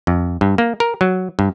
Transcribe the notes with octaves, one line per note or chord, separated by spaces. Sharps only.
F2
G2
A#3
A#4
F#3
G2